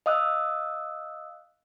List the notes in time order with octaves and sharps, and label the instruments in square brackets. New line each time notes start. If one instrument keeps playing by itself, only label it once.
[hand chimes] D#5 F5 D#6 E6 F#6